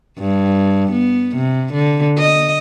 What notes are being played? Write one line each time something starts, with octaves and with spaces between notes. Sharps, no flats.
G2
B3
C3
D3
D#5